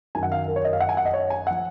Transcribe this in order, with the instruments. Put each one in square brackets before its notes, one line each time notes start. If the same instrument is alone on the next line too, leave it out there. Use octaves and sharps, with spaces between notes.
[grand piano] F#2 D#3 F#3 G#5
F#5
F5
A#4
C#5
D#5
F5
F#5
G#5
F#5
D#5
C#5
G#5
F3 F#5